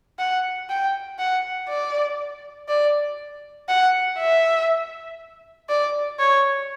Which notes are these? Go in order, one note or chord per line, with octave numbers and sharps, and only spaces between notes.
F#5
G5
F#5
D5
D5
F#5
E5
D5
C#5